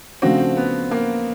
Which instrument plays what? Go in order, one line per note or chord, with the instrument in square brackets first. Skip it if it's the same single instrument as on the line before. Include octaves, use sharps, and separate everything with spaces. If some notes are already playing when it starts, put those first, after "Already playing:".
[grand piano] C#3 F3 A3 D4 F#4 [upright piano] C4
[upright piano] B3
A#3